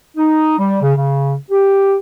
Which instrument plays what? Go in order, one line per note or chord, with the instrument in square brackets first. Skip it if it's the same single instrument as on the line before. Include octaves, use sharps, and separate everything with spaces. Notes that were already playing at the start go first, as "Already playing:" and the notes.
[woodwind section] D#4
G3
C#3
C#3
G4